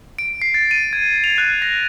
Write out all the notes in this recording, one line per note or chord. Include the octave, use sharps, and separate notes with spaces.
D7
C7
A6
D#7
G#6
F7
F#6
A#6